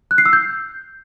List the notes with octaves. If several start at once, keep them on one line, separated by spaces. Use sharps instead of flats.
F#6
C7
E6
G6